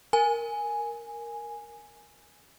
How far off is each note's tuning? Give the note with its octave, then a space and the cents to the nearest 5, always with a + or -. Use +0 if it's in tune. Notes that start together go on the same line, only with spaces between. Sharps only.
A#4 +0 G#5 +0